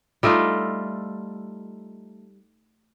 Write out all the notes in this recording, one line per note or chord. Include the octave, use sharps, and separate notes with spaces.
G3 A3 D#4 F4